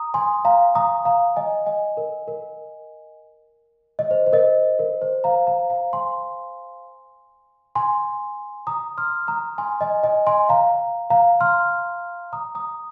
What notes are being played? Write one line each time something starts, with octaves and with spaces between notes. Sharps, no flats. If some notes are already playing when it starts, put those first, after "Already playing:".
Already playing: A#5 D#6
G#5 C6
F5 A#5
A#5 D#6
F5 A#5
D#5 G#5
D#5 G#5
A#4
A#4
D#5
C5
C5
A#4 D#5
A#4
C5
F5 A#5
F5 A#5
F5 A#5
G#5 C6
G#5 C6
A#5 D#6
C6 F6
A#5 D#6
G#5 C6
D#5 G#5
D#5 G#5
G#5 C6
F5 A#5
F5 A#5
C6 F6
A#5 D#6
A#5 D#6